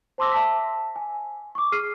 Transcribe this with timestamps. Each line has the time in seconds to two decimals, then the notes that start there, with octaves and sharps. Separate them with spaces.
0.18 C5 A5 C6 D6 E6 A#6
0.32 E5 A5 B6
0.96 G#5
1.55 C#6 D6
1.72 G#4 F6 C7 D#7